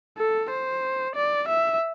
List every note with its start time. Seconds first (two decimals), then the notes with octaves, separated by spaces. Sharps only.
0.19 A4
0.50 C5
1.15 D5
1.48 E5